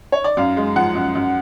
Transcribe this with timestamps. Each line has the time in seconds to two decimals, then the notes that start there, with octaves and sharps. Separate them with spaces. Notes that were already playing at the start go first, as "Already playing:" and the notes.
0.12 C#5
0.24 D5
0.37 F#2 F5
0.57 G#3
0.76 F3 F#5
0.95 F#2
1.15 F#2